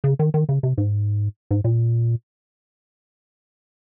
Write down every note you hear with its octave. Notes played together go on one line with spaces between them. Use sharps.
C#3
D#3
D#3
C#3
C3
G#2
G#2
A#2